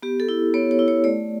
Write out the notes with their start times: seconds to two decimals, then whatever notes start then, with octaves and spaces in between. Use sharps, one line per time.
0.02 B3 G4
0.20 A4
0.29 E4
0.54 B3 C#5
0.71 C#5
0.79 E4
0.88 C#5
1.04 A3 D5